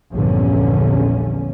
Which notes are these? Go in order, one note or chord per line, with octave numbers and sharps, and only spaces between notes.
A#1 E2 G2 D3 C#4